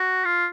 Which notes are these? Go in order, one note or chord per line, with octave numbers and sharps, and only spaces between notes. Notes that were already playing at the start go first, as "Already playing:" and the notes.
Already playing: F#4
F4